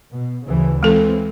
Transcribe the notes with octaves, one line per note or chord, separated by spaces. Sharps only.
B2
D2 C#3 E3
E3 G#3 C4 A4